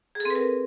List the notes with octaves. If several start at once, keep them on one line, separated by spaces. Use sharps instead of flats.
G#4
A4
C4
B4
A#4